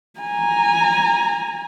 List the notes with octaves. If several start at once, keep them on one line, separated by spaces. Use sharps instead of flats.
G#5 A#5